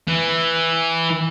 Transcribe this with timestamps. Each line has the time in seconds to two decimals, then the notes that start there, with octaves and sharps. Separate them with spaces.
0.08 E3